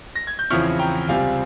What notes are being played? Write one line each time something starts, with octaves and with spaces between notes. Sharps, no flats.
A#6
G#6
G6
E2 C#3 F3 C4 E4 C#6 F6
G5 A#5
C#2 C3 G3 C4 F4 F5 G#5